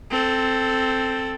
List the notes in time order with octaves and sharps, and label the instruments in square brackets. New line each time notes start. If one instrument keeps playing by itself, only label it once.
[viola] C4 A4